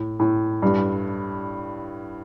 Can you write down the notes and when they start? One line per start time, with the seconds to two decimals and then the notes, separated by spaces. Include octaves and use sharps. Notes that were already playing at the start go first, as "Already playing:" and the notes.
Already playing: A2
0.20 A2
0.62 G2